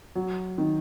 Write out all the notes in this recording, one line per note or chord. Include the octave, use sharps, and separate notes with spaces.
F#3
D#3